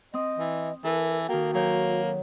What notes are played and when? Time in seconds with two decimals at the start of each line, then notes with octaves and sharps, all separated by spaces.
0.14 C4 D#5 D#6
0.38 E3
0.84 E3 A4 A#4
1.29 D#3 A#3 F#4 G5
1.54 F#3 A#3 C#5 G6